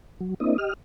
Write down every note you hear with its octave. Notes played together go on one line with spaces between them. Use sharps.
F#3
A#3 C4 D4 E4 D#5
G4 D#5 F6